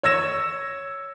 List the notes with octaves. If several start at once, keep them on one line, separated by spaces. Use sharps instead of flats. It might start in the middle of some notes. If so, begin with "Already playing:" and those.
C#5 E6 G#6 A#6 E7